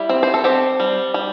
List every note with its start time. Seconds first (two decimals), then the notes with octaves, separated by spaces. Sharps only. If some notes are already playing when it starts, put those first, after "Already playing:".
Already playing: G3 E4
0.09 C4
0.23 C5
0.34 A4
0.44 C4 G4
0.80 G3
1.14 G3